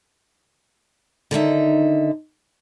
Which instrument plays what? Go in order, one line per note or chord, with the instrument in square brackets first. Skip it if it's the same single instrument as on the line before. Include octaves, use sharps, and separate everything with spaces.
[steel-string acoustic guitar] D3 D#3 D#4 E5